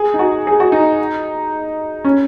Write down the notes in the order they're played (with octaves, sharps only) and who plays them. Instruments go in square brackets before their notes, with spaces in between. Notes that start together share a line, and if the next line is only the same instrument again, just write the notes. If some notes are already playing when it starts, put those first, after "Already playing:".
Already playing: [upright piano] G#4
D#4
F#4
G#4
F#4
D#4
C#4